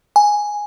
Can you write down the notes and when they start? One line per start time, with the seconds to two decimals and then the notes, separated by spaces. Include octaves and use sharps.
0.16 G#5